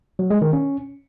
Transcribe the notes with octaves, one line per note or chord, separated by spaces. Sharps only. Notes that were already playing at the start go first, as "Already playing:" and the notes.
F#3
G#3
D#3
C#4